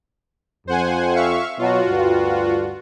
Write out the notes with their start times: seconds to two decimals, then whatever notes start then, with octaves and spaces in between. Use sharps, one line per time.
0.67 F2 C5 F#5 G#5
1.16 E5 F5 C#6
1.59 B2 F#3 F4 F#4
1.89 D2 G2